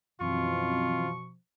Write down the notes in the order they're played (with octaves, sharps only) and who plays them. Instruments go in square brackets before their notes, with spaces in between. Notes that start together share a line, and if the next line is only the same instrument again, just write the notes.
[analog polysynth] F#2 E3 C4 [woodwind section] B2 F3 [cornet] F4 [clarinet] C#6